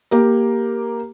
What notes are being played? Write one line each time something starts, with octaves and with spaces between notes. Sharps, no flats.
A#3 G4 A#4